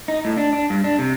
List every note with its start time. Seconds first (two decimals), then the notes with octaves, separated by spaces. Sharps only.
0.08 D#4
0.25 A2
0.37 D4
0.53 D4
0.70 G2
0.84 D4
0.99 C3